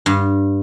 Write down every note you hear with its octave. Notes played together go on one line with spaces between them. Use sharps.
G2